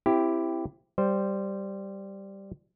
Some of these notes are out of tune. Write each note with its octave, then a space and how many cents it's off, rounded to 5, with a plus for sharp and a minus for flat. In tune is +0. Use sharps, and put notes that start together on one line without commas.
C4 +0 E4 +10 G4 +0
G3 +0 C5 -5